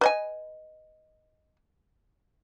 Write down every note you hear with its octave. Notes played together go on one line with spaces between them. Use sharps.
B4 D#5 G#5